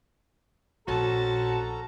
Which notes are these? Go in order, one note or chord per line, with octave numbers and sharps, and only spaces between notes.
A#1 C4 C#4 F#4 A4 A5 A#5